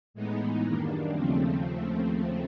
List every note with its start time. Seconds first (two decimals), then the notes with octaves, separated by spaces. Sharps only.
0.14 A2 E3 G#3 B3 D#4
0.64 F#2 D#3 G3 A#3 D4
1.13 D#2 C#3 F3 A3 C4